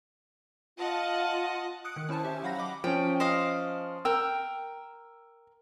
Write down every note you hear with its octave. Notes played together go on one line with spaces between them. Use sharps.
F4 D#5 F#5 A5
D#6 F#6 C#7 D7
D#3
C#4 E4 C5 G#5 A5
G4 E5
F#3 F5 F#5 B5 A#6
D#5 B5 D6
F3 C#4 G5
C5 D#5 F5
A#4 G5 E6